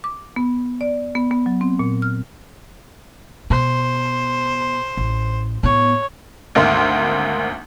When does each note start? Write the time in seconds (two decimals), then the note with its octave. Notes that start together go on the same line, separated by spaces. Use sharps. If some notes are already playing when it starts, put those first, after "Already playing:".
0.04 D6
0.36 B3
0.81 D5
1.15 B3
1.31 B3
1.46 F#3
1.61 C4
1.79 A#2
2.02 F6
3.50 B2 C5
4.97 A1
5.63 A2 B3 C#5
6.55 G#1 D2 A#3 C6 F6